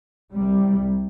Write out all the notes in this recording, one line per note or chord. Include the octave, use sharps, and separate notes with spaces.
C2 C3 G3